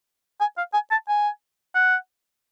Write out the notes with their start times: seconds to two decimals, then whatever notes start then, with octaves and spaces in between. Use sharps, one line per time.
0.41 G#5
0.58 F5
0.74 G#5
0.91 A5
1.08 G#5
1.75 F#5